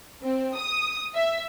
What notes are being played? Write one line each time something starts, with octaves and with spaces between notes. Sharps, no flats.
C4
D#6
E5